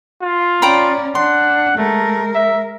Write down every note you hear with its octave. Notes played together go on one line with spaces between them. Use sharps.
F4
C#4 D5 G5 A#5 B5
D4 F#5 C6
G#3 A3 A#4
E5